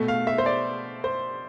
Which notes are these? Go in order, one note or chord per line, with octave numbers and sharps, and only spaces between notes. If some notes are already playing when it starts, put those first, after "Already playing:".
Already playing: B2 A3
F5
E5
C5
D5
C5